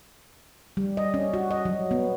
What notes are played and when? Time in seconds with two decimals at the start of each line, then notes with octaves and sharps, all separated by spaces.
0.77 G3
0.97 D#5
1.14 C#4
1.34 F#4
1.51 D#5
1.65 F#3
1.91 B3